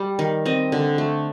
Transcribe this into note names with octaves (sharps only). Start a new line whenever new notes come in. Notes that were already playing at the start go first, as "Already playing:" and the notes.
Already playing: G3
D#3
C4 D#5
D3
A3